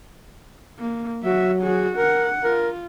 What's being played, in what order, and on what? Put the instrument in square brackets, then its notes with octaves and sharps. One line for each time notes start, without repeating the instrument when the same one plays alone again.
[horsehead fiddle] A#3
[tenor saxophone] F#3 [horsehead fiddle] F#4 E5
[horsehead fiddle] F#4 G#4
[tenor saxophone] A#4 [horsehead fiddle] F#5
[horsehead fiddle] F4 [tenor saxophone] A#4